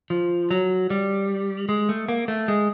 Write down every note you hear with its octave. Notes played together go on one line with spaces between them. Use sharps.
F3
F#3
G3
G#3
A3
A#3
A3
G#3